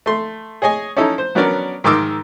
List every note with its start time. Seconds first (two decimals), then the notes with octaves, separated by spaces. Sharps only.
0.06 A3 C6
0.62 G#4 C#5 D#5 G#5
0.97 C#4 D#4 E4 A4 A#5
1.18 C5
1.35 F#3 B3 C#4 D4 A#4 D5
1.84 G#2 D#3 A#4 C6 D6 E6